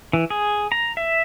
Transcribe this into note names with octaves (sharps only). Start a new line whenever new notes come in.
E3
G#4
A#5
E5